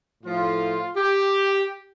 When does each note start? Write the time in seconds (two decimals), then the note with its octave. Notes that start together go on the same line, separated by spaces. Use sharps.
0.23 A2 F3 F4
0.96 G4